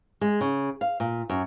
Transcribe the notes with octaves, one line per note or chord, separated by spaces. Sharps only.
G#3
C#3
F5
A#2
F#2